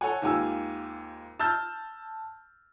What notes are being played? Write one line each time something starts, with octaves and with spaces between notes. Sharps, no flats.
A4 C#5 F#5 G#5
D#2 G#2 F4 G4 G#5 E6
A5 E6 F6 G6 A6